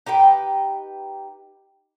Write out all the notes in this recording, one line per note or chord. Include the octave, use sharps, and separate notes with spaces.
D#4 G4 B4 G5